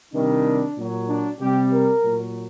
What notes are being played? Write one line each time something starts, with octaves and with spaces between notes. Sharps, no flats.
C3 D#3 G3 D4
A#2 F#3
D4
C3 G3 G4
A#4
A#2 F#3